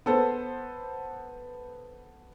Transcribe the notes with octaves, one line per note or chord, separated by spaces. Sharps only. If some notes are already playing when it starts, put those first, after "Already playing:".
B3 A4 C5